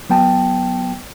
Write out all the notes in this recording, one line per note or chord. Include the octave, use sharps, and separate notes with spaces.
F#3 B3 G5 A5